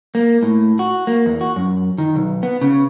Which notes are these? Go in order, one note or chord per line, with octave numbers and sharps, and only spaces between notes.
A#3
A2
F#4
A#3
E2
F#4
F#2
D#3
B1
B3
C#3